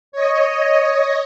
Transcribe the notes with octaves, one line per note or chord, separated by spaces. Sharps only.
C#5 D#5